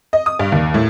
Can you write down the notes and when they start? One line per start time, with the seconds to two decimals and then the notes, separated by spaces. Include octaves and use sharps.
0.13 D#5
0.26 D#6
0.39 G2
0.52 D#2
0.74 A2